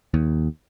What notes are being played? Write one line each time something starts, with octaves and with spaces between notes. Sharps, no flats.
D#2